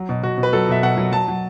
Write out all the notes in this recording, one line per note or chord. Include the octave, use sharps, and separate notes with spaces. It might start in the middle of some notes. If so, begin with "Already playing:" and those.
Already playing: F#3
B2
B2 F#4
B2
B4
F#3 A4
B2 E5
B2 F#5
F#3
F#3 A5
F#3